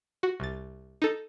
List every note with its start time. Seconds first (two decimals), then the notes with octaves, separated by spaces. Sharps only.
0.23 F#4
0.40 C2 A6
1.02 D#4 A4